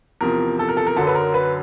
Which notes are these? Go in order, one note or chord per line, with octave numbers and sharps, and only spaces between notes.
E2 C3 F3 A#4
A4
A#4
A4
A#4
F#2 D3 F#3 A4
B4
A#4
B4